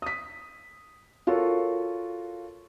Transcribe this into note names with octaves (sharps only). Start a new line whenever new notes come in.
D#6 B6
F4 F#4 A4 A#4 C#5